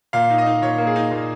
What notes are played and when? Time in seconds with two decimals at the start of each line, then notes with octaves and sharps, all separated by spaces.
0.13 A#2 F5
0.30 D#4
0.38 D#5
0.46 D#4
0.62 A#2 C#5
0.78 A#3
0.87 G#4
0.96 D#4
1.11 A#2